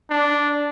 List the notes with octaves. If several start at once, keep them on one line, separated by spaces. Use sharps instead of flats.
D4